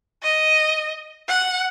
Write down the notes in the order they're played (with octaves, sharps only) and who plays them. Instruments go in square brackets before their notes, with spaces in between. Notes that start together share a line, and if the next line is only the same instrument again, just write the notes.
[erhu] D#5
F#5